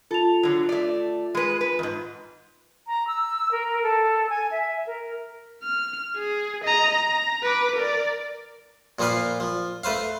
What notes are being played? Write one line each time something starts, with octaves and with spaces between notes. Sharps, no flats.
F4 A4 F7
D3 F#3
A3 D5
G#3 B4
B4
F2 G#2
A#5
E6
A#4
A4
G#5
E5
A#4
F6
G#4
D#5 A#5
A#5
B4 D6
A#4 D5
A#2 F3 A#3 B4 F5
F3
A3 B4 C5 F5